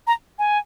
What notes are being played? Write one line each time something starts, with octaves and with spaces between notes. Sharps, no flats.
A#5
G#5